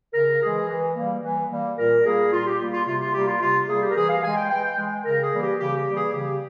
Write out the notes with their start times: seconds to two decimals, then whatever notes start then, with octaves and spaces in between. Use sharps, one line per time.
0.13 C#3 A#4
0.41 E3 G#3 G#4
0.69 E3
0.96 G3 A#3
1.23 E3
1.51 G3 A#3
1.77 A#2 A#4
2.05 G3 A#3 G#4
2.32 A#2 F4
2.46 G4
2.60 G3 A#3
2.73 F4
2.87 C3 F4
3.01 F4
3.14 G3 A#3 G4
3.28 F4
3.41 C3 F4
3.69 G3 A#3 G#4
3.82 G4
3.90 A#4
3.96 E3 G#4
4.10 F5
4.24 G#3 G#5
4.37 G5
4.51 E3 G5
4.64 G5
4.78 G#3
5.05 C#3 A#4
5.23 G#4
5.32 E3 G3 A#3
5.42 G4
5.59 C#3 G4
5.78 G4
5.88 E3 G3 A#3
5.96 G#4
6.14 C#3 G4